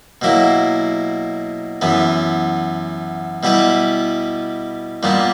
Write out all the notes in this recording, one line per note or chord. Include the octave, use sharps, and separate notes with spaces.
B2 F#3 A#3 E4
F#2 E3 B3
B2 G3 B3 E4 B4
A#2 G3 B3 D4